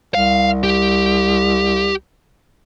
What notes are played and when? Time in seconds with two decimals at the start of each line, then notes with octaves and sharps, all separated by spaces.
0.15 C2 F5
0.63 G4